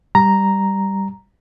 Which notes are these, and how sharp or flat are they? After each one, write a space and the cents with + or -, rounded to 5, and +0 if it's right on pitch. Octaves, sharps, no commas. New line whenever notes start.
G3 +0 A#5 +0